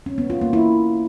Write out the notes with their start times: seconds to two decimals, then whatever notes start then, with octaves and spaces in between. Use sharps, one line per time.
0.06 C#4
0.18 B3
0.30 F4
0.41 A#3
0.53 E4